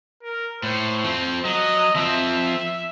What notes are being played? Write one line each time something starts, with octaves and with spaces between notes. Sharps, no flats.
A#4
A2 C5
F3 C4
F#3 D#5
F3 C4 E5